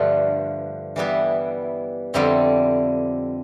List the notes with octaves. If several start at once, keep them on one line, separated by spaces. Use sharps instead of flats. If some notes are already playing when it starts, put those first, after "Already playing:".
Already playing: G2 D3 F3 A3
E3 G3 B3 E4
F2 D3 G3 C4 E4